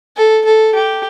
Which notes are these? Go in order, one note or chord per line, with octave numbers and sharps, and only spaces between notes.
A4
A4
G4